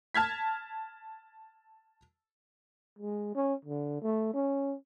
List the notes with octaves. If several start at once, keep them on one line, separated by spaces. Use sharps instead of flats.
A5 F6 G#6 B6
G#3
C#4
D3
A3
C#4